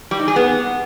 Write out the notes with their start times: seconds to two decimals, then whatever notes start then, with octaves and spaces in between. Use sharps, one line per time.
0.11 G3
0.19 D#4
0.28 G#4
0.36 B3